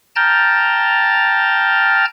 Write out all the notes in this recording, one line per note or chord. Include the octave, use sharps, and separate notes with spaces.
G5 A5 A#5 F6 G6 A6